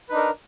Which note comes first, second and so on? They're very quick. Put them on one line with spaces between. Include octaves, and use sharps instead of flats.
B4 D#4 D4 A#4